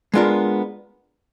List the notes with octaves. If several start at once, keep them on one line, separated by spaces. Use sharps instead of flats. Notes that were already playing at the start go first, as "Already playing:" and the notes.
G#3 B3 D4 F4 A#4